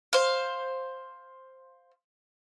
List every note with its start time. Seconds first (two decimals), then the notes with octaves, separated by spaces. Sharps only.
0.13 C5 F5